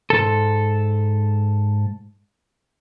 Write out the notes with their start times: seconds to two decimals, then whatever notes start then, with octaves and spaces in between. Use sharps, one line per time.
0.10 G#2 B2 A4